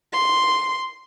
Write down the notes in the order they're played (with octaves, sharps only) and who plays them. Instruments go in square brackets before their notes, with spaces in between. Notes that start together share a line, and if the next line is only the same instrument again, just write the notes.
[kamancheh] C6